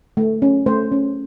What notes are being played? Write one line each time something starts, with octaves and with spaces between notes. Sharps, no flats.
A3
C#4
A3 C5
C#4